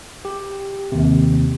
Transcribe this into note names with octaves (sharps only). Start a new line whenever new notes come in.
G4
D#2 C3